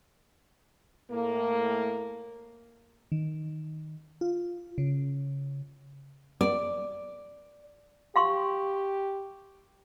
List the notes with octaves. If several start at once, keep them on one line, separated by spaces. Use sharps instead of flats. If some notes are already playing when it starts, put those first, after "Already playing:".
A2 A#3
D#3
F4
C#3
D5
G4 F5 C6 C#6